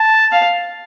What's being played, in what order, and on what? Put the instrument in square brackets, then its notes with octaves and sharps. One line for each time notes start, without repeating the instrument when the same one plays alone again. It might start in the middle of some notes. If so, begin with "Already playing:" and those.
Already playing: [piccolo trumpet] A5
[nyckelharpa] F5